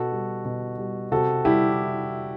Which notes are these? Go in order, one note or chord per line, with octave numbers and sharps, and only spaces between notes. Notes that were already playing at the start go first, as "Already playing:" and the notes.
Already playing: B2 F#4 A4
G3
B2
G3
C3 F#4 A4
G3 E4 G4